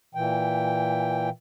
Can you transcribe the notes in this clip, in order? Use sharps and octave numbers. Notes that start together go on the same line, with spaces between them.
A#2 E3 G5